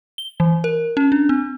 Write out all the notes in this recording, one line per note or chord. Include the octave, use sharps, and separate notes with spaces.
G7
E3
A#4
C#4
D4
C4